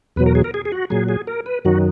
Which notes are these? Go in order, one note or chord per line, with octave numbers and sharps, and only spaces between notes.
E2 B2 F#3 B4
A#4
G#4
A#4
G#4
G#4
F#4
A#2 F#3 G#4
G#4
A#4
B4
F#2 D#3 F#3 F#4